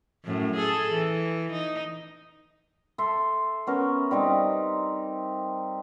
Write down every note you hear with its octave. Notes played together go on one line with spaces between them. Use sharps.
F#2 A2
G#4 A4
E3
D#4
A4 E5 C6
B3 C#4 A#4
G3 C4 D#4 D6